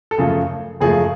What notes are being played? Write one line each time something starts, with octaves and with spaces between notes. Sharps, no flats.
A4
F#2 C#3 F3 A3 G#4
F#2 C#3 F3 A3 G#4